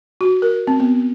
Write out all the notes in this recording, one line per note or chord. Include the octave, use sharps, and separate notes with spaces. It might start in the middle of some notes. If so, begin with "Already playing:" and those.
F#4
A#4
C4
B3